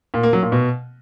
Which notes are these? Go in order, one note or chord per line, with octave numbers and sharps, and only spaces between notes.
A#2
A#3
F#3
A#2
B2